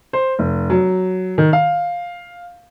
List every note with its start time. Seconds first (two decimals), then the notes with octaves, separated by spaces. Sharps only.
0.13 C5
0.39 F1
0.70 F#3
1.38 D#3
1.53 F5